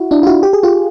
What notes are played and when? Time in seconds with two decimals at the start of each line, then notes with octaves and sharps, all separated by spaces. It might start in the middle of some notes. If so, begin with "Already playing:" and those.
Already playing: E4 F#4
0.11 D4 E4
0.23 F4
0.27 E4 F#4
0.43 G4
0.53 G#4
0.63 F4 G4